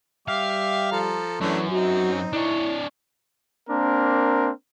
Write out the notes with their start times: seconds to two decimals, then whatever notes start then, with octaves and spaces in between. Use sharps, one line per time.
0.28 G3 E5 F5 G5 D6
0.92 F3 A4 A#5
1.41 F#2 E3 A3 C#4 D4
1.71 C4 D#4 F#4
2.33 D4 E4 C#5
3.69 A#3 C4 D4 A#4